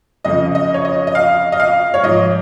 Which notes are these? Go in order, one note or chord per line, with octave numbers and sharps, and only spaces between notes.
F2 C#3 F3 D#5
D#5
C#5
D#5
D#5
F5
D#5
F5
C#5
G#2 F3 D#5